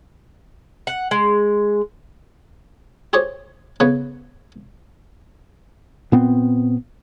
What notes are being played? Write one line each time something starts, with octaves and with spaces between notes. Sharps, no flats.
F#5
G#3
G4 G#4 C5 C#5
C#3 B3 B4 C#5
A#2 B3 C4